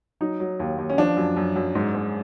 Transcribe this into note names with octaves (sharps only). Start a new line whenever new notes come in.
F#3 D#4
F#3
D#2
D#2
C#4
F3 D4
F#2
F#2
F#2
G#2
G#2